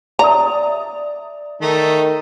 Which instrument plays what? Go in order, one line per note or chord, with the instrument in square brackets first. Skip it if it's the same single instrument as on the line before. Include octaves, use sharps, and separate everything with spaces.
[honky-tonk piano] D5 E5 D#6 [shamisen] A#5
[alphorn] D#3 [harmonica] A3 D#4